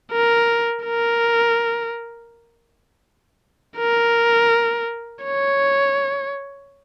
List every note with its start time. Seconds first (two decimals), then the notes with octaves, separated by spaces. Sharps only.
0.12 A#4
0.85 A#4
3.77 A#4
5.24 C#5